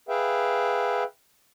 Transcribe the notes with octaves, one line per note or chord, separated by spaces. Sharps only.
G#4 B4 E5 F5 G5